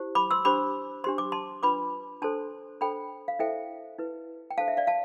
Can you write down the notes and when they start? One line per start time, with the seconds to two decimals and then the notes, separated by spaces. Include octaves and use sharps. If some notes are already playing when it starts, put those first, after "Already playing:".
Already playing: E4 G4 C5
0.15 B5 D6
0.31 C6 E6
0.45 D4 G4 C5 B5 D6
1.04 D4 G4 C5 C6
1.18 D6
1.32 A5 C6
1.63 D4 F4 B4 B5 D6
2.22 D4 A4 C5 A5 C6
2.81 D4 A4 C5 G5 B5
3.28 F5
3.39 E4 A4 C5 E5 G5
3.99 E4 B4
4.51 G5
4.58 D4 A4 C5 F5 A5
4.68 E5
4.77 D5 F5
4.87 F5 A5